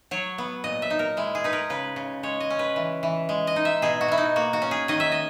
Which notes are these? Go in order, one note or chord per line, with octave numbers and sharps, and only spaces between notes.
F#3 C#5
B3
A#2 D#5
E5
D#4
A#4
G#3 E4
G#4
D#4 B4
A#4
C#3 B4
C#3
G#3 C#5
D#5
C#4
B4
E3
E3
G#3
D#5
D#4
E5
B2 G#4
F#4
B2 E4
D#4
A#3 F#4
F#4
C#4
G#4
D#3 D#5
E5
D#5